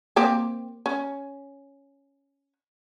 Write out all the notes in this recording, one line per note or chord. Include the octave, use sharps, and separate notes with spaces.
A#3 C4 G4
C#4